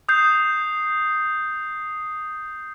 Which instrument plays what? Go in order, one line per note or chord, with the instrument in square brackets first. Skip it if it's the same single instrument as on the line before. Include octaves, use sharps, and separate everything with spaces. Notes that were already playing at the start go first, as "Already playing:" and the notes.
[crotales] D#6 G6 C7